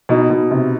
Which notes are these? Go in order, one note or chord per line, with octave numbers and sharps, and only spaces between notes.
B2 D#4
B2
C3